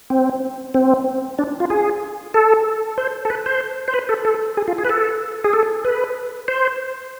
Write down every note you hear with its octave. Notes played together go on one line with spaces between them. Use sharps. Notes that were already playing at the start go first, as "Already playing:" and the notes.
C4
C4
D4
F4
G#4
A4
C5
A4
B4
C5
C5
B4
A4
A4
G#4
F4
G#4
B4
A4
G#4
A4
B4
C5